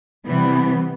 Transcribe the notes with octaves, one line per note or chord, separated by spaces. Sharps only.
C3 E3 G3 B3